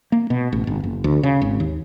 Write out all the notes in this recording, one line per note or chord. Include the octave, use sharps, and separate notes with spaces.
A#3
B2
A1
G1
F#1
D2
C#3
G#1
D#2